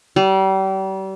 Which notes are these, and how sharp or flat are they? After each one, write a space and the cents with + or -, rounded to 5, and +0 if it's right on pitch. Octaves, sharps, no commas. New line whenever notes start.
G3 -35